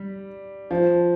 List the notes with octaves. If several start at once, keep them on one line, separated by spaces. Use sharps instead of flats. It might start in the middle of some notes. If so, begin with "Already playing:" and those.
Already playing: G3
F3